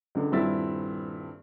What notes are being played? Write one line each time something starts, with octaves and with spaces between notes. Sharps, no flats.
C#2 D3
D#1 G2 C4 E4 E5 A6